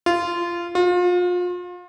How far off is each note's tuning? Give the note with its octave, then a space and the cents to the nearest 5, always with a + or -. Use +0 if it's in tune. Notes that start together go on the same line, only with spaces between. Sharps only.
F4 -15
F4 +35